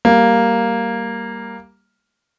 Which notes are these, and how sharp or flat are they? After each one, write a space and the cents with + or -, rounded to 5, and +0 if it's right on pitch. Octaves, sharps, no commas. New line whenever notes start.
G3 +0 A#3 +0